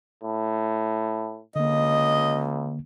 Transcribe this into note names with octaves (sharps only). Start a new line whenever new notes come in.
A2
C#2 D3 A#3 D#5